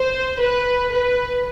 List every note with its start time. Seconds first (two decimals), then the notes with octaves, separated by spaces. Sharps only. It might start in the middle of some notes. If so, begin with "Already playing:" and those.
Already playing: C5
0.40 B4
0.92 B4